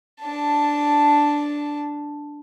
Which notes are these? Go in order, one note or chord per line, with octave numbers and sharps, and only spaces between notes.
D4 A5